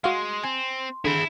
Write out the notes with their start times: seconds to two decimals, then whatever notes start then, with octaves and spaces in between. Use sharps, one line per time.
0.04 G#3 F#4 F5 C6
0.43 C4 G#5
1.05 D3 E4 G#4 B5